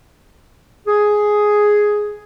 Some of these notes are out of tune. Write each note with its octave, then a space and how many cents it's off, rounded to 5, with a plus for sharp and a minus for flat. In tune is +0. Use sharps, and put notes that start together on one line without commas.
G#4 +5